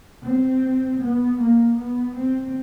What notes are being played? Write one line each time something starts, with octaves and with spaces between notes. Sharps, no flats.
C4
B3
A#3
B3
C4